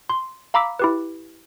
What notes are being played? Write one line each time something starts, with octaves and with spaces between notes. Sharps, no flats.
C6
F5 A#5 B5 D6 E6 B6
E4 G4 B4